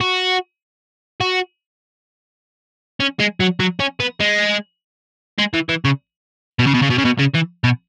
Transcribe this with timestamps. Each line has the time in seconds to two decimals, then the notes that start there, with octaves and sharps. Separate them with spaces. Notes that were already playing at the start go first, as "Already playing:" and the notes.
0.01 F#4
1.20 F#4
3.00 C#4
3.20 G#3
3.40 F#3
3.60 F#3
3.80 C#4
4.00 B3
4.20 G#3
5.39 G#3
5.54 E3
5.69 E3
5.85 C#3
6.59 B2
6.67 C#3
6.74 B2
6.82 C#3
6.90 B2
6.98 C#3
7.05 B2
7.18 C#3
7.34 E3
7.64 B2